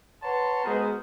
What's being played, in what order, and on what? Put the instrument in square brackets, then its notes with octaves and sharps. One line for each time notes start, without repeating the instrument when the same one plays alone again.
[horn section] B4 C#5 F#5 A5 A#5 C6
G#3 B3 F#4 G#4 A#4 C5